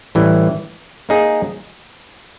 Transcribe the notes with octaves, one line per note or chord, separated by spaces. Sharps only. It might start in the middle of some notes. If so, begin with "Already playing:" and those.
A2 E3 G3
A#3 D#4 G#4